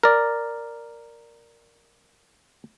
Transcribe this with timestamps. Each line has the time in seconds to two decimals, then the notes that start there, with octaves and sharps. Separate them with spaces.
0.03 A#4 D5